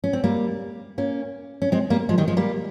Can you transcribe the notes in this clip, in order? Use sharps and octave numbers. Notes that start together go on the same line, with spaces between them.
C#4
C4
G3 A#3
A#3 C#4
C#4
G#3 C4
G3 A#3
F3 G#3
D#3 G3
F3 G#3
G3 A#3